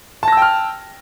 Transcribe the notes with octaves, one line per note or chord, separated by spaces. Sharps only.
G5 A5 E6 F6 A#6